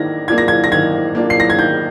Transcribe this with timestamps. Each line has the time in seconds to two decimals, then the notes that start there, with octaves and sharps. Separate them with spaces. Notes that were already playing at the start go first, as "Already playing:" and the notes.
Already playing: D#3 A#3 D4 G#6 A#6
0.28 A#3 D4 F4 G#6
0.38 A#6
0.48 G#6
0.64 A#6
0.71 D#3 G#6
1.15 A#3 D4 F4
1.30 C7
1.40 A#6
1.50 G#6
1.58 D#3 G6